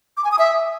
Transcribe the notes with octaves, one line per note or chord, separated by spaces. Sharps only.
D6
G#5
D#6
E5